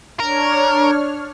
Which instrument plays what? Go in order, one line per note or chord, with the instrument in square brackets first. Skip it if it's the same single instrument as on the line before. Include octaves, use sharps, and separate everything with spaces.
[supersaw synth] D4 C#5 F6 [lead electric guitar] A#4